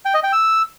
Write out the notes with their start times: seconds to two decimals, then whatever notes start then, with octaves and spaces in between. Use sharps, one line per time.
0.05 G5
0.14 D#5
0.23 G5
0.33 E6